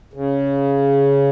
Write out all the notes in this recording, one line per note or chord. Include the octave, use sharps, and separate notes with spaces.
C#3